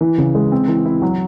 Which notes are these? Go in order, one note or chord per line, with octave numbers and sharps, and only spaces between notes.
E3
C#3
G#3
C4
E3
E4
F#3